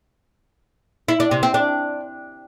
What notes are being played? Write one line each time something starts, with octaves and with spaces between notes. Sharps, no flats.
E4
D4
C3
C4
D4